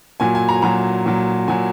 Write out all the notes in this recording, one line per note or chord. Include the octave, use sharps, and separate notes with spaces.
A#2 F#3 G#5
G#5
A#5
G#5
A#2 F#3 A#5
A#2 F#3
A#2 F#3 G#5